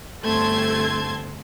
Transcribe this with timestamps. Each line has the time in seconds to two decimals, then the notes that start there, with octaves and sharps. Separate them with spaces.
0.22 G1 A3 C4 A5 C6 G#6